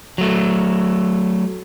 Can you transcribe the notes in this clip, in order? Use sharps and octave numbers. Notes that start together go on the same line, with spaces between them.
F#3 A3